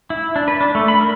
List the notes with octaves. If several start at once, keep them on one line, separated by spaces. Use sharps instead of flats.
E4
D4
B4
D4
A3
B5
A#4